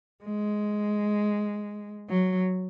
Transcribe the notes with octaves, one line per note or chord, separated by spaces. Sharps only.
G#3
F#3